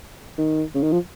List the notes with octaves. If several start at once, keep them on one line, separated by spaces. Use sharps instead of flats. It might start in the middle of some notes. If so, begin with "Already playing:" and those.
D#3
C#3
D#3
F3